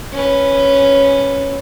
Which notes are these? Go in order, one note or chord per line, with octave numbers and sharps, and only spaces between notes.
C#4 B4